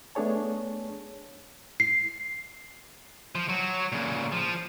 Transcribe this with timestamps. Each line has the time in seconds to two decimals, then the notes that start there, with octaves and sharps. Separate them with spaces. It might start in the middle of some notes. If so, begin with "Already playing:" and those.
0.15 A3 B3 D4 G#4 C#5 A5
1.80 C7
3.35 F3
3.49 F#3 F#4
3.92 A#2 C#3
4.32 F3